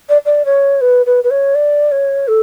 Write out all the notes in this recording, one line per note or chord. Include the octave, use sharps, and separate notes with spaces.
D5
D5
C#5
B4
B4
B4
C#5
D5
C#5
A4